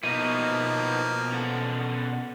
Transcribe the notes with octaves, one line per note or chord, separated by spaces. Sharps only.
B2 F3 A#3 B3 D#4 E4 D#7
C#4 A4 F#5